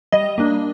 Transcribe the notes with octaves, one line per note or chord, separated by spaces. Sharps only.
G3 D#5
A#3 D4